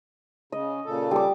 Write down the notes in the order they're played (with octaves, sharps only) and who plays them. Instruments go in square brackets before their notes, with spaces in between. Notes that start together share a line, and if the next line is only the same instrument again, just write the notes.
[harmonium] C#3 [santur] D#5
[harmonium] A#2 C#3 A4
[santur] G3 D6